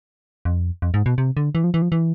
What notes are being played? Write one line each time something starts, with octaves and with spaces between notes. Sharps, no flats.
F2
F2
G#2
B2
C3
D3
E3
F3
E3
F3
E3